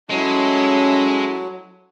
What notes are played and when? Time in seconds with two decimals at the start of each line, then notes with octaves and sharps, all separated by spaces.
0.10 F#3 G#3 C#4 E4 A4